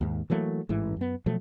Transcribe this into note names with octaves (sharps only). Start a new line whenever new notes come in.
D#2 G#2
E3 F#3 A3 A#3
A1 G#2 E3
F#2 B3
B2 F3 F#3 A3